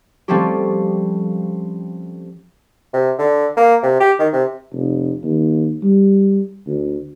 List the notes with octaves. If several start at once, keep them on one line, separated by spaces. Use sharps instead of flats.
F3 G3 A3 C4 C#4 G4
C3
D3
A#3
C3
G4
D#3
C3
F1
D#2
G3
D2